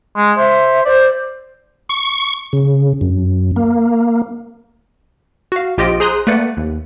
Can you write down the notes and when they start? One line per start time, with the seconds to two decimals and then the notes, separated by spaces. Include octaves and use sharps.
0.17 G#3
0.38 C5 E5
0.86 C5 D5
1.89 C#6
2.53 C#3
3.01 F#2
3.56 A#3
5.52 F#4 F5
5.78 A#1 F4 G4 C5 D#5 D7
6.00 G#4 C5 A#5 C6 D#6 F#6
6.27 A3 A#3 B4 D5 F#5
6.57 D#2